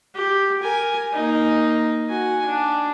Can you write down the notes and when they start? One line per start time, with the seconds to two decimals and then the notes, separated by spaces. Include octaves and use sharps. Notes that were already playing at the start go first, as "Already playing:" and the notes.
0.15 G4
0.63 A#4 G#5
1.13 A#3 D#4
2.08 F#4 G#5
2.46 D4